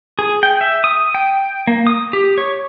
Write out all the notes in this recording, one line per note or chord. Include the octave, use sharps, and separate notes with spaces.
G#4
G5
E5
D#6
G5
A#3
D#6
G4
C#5